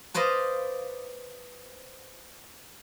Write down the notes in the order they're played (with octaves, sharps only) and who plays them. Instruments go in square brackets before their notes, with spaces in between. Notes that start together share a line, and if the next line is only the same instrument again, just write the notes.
[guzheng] B4 C5 D5 D#5 F5